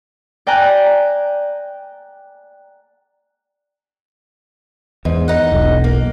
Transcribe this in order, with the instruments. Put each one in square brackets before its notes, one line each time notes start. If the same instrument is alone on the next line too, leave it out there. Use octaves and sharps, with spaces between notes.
[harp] D5 G5 G#5 A#5 F#6 G6
[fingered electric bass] E2 [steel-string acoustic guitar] G#2
[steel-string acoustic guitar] D#4 F#5
[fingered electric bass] E1 B1
[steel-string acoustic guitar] A#3